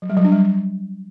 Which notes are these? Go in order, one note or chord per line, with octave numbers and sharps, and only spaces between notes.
F#3
G3
F#3
D4
G3